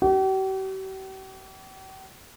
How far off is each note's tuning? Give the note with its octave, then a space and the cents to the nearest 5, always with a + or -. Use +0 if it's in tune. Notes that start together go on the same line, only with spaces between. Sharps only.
G4 -45